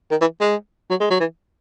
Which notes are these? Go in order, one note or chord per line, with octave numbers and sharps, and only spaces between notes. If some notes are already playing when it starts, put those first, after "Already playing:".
D#3
E3
G#3
F#3
G#3
F#3
E3